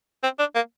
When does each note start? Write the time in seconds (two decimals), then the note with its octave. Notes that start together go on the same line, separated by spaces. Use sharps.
0.23 C4
0.39 D4
0.55 A#3